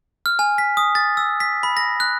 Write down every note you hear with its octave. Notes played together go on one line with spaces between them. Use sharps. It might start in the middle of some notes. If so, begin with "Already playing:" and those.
F6
G#5
B6
D#6
A6
E6
B6
B5
A#6
F#6